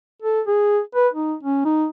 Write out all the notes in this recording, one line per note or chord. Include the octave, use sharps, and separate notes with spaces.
A4
G#4
B4
D#4
C#4
D#4